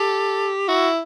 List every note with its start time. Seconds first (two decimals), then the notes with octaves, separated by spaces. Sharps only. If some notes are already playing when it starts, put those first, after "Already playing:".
Already playing: G4 A4
0.68 E4 F#4